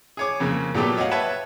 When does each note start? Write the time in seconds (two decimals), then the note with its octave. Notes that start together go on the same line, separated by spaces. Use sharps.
0.17 G#4 C#5 D6
0.40 F2 C#3 A#3
0.75 A#2 F#3 A3 B3 G4 A4
0.97 C#5 D#5 F5 F#5
1.11 B4 C#5 E5 G5 A5